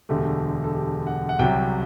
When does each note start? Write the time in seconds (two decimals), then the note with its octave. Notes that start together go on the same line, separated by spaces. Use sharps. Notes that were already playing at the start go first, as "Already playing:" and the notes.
0.09 E1 D2 D3 A3 G4
0.64 A4
0.74 G4
1.07 F#5
1.29 F#5
1.39 C2 C3 F#3 G5